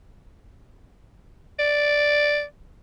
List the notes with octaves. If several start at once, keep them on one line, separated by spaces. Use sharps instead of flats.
D5